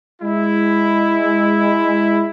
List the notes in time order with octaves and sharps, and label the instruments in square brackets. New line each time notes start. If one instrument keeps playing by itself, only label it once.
[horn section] G#3 E4